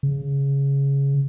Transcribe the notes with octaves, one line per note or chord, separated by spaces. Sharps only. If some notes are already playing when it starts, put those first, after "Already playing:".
C#3